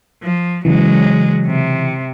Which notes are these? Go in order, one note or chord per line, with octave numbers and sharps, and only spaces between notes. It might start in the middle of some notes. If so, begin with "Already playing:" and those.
F3
C#3 E3 F#3 G#3
C3